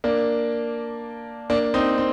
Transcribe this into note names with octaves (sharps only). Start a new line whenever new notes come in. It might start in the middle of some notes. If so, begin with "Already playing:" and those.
A#3 D4
A#3 D4
C4 D#4
C4